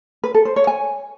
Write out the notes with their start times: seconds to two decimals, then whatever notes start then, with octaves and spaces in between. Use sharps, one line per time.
0.24 B4
0.34 A4
0.45 C5
0.56 C#5
0.67 G#5